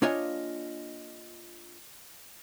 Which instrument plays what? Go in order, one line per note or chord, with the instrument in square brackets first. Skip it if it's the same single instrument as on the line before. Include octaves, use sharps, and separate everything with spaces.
[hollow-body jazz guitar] A#3 D4 F4 C#5 D#5 G#5